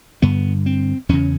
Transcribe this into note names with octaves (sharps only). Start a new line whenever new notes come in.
G2 D3 B3
C4
E2 C#3 C#4